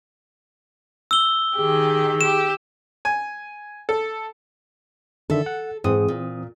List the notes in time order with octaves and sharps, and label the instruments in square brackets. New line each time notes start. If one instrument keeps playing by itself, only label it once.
[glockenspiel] E6 G7
[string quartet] D#3 G4 [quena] G#4
[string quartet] G4 [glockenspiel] E7
[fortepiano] G#5
A4
[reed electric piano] D3 D#3 E5 [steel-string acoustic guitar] A4
[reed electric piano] F#5
[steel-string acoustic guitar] G#2 [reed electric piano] E3 C4 D#6
[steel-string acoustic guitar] A#2